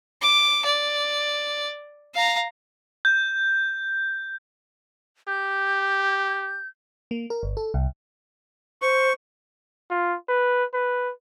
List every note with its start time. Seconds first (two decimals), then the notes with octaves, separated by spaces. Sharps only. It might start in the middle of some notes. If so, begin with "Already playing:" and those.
0.22 D6
0.65 D5
2.15 F5 A#5
3.05 G6
5.28 G4 G6
7.11 A#3
7.30 A#4
7.43 G1
7.57 A4
7.74 C2
8.82 C5 C#6
9.90 F4
10.29 B4
10.74 B4